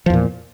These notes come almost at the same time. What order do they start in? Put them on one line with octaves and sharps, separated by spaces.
F3 E2 A#2